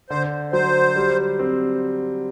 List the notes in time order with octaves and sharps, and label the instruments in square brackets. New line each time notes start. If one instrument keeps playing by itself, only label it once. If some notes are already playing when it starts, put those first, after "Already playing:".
[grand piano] D3 [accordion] C5
[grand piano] F#3 [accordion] C5
[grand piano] G3
C4